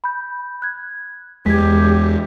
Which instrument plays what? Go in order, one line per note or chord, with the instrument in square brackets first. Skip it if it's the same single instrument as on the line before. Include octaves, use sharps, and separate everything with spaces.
[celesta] B5 G6
F#6 G#6
[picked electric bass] E2 G#3 [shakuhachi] G4 [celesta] G#6 B6